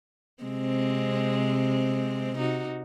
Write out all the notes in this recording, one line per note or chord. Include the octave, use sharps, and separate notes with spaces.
C3 G#3 C4
C3 D#4 F#4